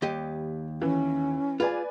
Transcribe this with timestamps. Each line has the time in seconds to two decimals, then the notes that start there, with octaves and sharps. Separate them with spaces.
0.02 D#2 G3 G4 D#5
0.82 E3 C#4
1.60 F4 G#4 B4 D5 G#5